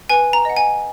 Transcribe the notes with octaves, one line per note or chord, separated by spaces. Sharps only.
B4 G#5
A#5
D#5 F#5
G#5